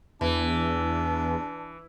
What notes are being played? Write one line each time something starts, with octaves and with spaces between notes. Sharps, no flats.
E2 E3 D4